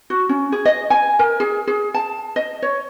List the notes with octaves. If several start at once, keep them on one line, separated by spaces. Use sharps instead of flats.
F#4
C#4
G#4
D#5
G#5
A#4
G#4
G#4
A5
D#5
C#5